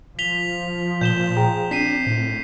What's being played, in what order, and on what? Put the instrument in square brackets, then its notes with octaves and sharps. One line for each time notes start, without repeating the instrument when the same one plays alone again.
[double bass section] F3 [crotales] B6 F7 G7
[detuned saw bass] A#2 [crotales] G6 E7 G7
[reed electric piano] G#4 G5 A#5
[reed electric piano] C4 [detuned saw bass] D4 [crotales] B6 C7 D#7
[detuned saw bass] A2